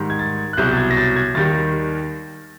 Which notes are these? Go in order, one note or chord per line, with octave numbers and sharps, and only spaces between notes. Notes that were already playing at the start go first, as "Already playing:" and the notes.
Already playing: G#2 D#3 G3
G#6
A6
F#6
C2 B2 F#3 G6
A6
G#6
A#6
A6
G#6
D#2 D#3 G3 A6